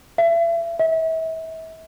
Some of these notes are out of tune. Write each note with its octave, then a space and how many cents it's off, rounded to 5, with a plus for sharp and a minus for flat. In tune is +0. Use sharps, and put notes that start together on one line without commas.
E5 +35
E5 -35